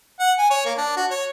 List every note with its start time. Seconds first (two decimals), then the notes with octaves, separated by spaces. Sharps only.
0.20 F#5
0.38 G#5
0.51 C#5
0.65 A#3
0.77 D4
0.97 F#4
1.11 C#5